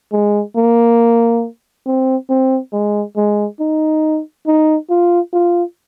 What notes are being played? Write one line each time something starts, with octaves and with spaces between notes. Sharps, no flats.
G#3
A#3
C4
C4
G#3
G#3
D#4
D#4
F4
F4